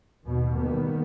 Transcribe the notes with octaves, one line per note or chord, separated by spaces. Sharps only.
D#2 B2
D#3 G3 A#3 B3